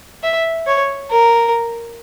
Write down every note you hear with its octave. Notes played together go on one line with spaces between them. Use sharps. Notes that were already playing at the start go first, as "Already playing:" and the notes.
E5
C#5
A#4